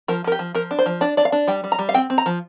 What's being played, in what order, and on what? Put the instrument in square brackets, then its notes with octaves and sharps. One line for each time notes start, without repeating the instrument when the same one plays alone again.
[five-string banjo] F3 A#4
F3 A#4
G4
F3
F3 A#4
D4
C5
F3
D4 D5
D4 D5
F5
D4
G3 G5
G3
A#5
G3
F5
C4 G5
C4
A#5
F3